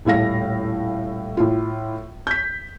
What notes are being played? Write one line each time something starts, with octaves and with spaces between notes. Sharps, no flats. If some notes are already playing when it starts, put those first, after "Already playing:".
D#1 A2 A3 F5 A#6
A2 F4
G6 B6